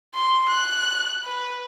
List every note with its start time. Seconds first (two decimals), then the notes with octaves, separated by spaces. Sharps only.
0.14 C6
0.48 F#6
1.24 B4